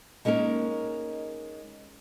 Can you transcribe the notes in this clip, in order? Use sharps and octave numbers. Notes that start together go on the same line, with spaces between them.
G#3 A#3 C#4 D#4 A#4